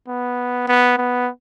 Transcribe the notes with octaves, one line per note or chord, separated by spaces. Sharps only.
B3
B3
B3